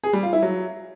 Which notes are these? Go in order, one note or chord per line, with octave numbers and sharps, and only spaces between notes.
G#4
G3
F4
E4
F#3